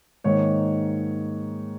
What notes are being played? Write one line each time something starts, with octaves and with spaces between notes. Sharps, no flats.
G#2 D#3 A#3 D#4 C#5